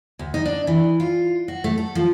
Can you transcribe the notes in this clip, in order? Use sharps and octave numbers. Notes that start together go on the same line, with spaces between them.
D2
D#4
D4
E3
F4
F#4
A3
A4
F3